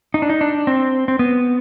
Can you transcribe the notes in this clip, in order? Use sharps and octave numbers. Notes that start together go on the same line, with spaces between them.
D#4
D4
D#4
D4
C4
C4
B3